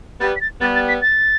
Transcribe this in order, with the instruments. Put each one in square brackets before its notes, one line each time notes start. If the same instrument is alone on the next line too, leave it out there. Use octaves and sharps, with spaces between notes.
[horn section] G3 B3 [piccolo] A6
[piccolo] B6
A6
[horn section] G3 B3 [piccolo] A6
[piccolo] A6
B6
A6